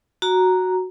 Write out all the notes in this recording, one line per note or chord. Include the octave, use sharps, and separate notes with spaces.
F#4 A#5